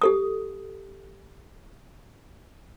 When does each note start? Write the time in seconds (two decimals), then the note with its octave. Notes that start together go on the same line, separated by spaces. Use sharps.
0.02 G4 A4 D#6